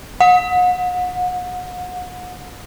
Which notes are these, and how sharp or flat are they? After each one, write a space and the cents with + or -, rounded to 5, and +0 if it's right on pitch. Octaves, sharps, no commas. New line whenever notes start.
F#5 -35